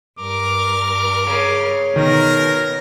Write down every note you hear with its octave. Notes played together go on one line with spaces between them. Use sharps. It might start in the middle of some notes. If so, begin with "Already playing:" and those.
G2 A#4 D6 F6
C#3
B2 D#3 A#4 A#6